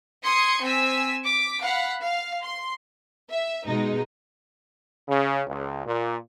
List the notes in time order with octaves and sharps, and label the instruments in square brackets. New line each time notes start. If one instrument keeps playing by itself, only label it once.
[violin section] C6 D#6 G#6 C#7
C4 G#5 E6 B6
D6 B6
F5 F#5 B5
F5
C6
[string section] E5
B2 G#3 D#4
[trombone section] C#3
C#2
A#2